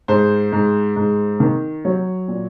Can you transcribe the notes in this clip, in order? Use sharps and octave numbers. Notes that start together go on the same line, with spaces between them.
G#2 C5
G#2
G#2
D#3
F#3 C#5
A#2